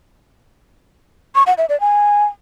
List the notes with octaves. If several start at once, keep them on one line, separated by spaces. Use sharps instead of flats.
C#6
F#5
E5
D5
G#5